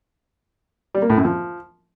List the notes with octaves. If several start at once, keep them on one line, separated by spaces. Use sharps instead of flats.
G3
A#3
A2
F#2
F3